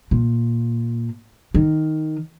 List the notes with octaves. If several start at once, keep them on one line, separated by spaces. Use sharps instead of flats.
A#2
D#3